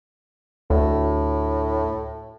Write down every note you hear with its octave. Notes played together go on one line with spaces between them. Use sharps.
D2 A2